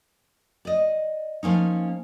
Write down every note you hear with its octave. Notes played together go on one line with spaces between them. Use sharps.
D5 D#5
F3 A#3 C#4 D#4